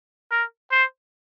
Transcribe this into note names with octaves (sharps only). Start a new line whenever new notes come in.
A#4
C5